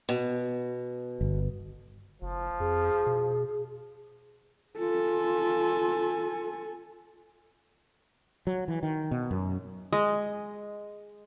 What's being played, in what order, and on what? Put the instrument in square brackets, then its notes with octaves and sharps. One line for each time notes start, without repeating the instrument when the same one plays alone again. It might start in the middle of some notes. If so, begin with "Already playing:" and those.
[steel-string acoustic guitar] B2
[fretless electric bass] G1
[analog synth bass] F#1 [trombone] F3
[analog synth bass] F2 [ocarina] G#4
[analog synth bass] B2
[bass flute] F4 [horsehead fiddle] A4 G#5
[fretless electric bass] F#3
E3
D#3
B2
F#2
[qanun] G#3